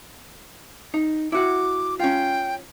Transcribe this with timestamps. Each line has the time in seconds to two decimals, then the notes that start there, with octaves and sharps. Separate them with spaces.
0.94 D#4
1.32 E4 F#4 F#5 D6
2.00 C#4 F4 G5